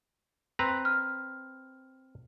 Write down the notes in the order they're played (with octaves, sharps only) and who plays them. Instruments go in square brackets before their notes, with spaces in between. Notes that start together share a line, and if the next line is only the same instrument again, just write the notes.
[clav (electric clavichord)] C4 B4 A#5
[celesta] F6